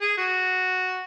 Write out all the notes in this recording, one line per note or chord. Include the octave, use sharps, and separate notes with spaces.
G#4
F#4